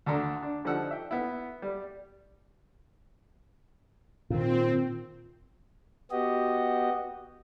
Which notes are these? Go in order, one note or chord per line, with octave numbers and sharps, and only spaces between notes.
D2 D4 A4 A#5 C6
D4
D3 F3 G3 D#4 F#5 E6
E5 G5
B3 E4
G3
A#2 D#3 C4 F4
B3 F#4 G4 D#5